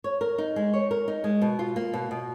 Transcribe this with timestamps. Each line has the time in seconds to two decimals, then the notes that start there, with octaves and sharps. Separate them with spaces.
0.04 C#5
0.21 A#4
0.38 D#4
0.56 G#3
0.74 C#5
0.91 A#4
1.08 D#4
1.24 G#3
1.41 B2
1.59 F4
1.76 A#3
1.93 B2
2.11 B2